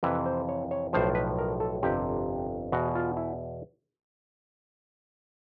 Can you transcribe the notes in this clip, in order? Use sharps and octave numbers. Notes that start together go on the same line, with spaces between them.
F2 C3 E3 B4
C5
C#5
C#5
B1 A2 F3 C5
B4
A#4
A4
G1 F2 C3 G4
E2 B2 F#4
F4
E4